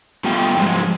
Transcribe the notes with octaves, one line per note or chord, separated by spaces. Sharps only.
B2 G3 A3 F4 G5
G#2 F3 F#3 G#3